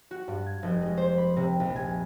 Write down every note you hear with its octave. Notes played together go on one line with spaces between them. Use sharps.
F#4
G2
G#6
F1
G#3
C5
B5
C3
A#1
G#5